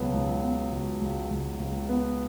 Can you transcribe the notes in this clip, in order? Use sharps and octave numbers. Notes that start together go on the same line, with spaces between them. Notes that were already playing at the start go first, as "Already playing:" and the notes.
Already playing: C#2 B2 F#3 B3
C#2
B3
C#2
C#2
C#2
C#2
B3